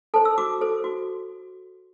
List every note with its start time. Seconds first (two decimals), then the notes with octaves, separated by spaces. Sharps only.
0.14 A4 C5 A5
0.25 E6
0.38 F#4 D6
0.61 A4 C5
0.84 F#4